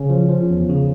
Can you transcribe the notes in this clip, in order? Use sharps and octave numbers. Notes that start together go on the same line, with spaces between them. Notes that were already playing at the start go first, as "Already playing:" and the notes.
Already playing: C#3 C#4
F3
F3
E2
C#3